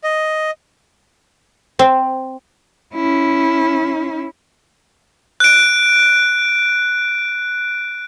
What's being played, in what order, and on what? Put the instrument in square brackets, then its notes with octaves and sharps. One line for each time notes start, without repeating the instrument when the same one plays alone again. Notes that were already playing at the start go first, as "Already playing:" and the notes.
[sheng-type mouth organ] D#5
[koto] C4
[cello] C#4 E4
[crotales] F#6 D7